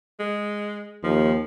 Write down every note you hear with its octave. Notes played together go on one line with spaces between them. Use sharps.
G#3
D#2 F3